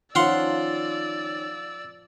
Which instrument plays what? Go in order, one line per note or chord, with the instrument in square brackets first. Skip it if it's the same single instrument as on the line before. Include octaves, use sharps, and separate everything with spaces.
[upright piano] D#3 C#4 [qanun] F3 [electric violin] D5 E6 [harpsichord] F5 F#5 C6